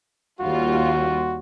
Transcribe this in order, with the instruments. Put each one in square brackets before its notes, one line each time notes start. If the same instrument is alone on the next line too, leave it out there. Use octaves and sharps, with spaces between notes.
[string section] D#2 G3 F4 [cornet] F#4